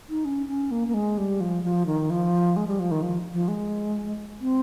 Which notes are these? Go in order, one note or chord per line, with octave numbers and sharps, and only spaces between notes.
D#4
C#4
C#4
A#3
A#3
G#3
G3
F3
F3
D#3
F3
G#3
G3
F3
D#3
F3
F3
G#3
C4